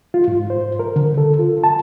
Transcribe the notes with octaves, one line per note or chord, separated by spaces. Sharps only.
F4
G#2
C5
A#4
D3
A4
F4
A5